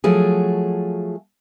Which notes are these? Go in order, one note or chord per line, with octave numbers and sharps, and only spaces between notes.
F3 F#3 A3 G#4